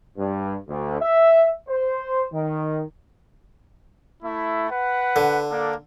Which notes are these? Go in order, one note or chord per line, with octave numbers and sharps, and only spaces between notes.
G2
D2
E5
C5
D#3
A3 E4
B4 F#5
D3
A#3 D4 A4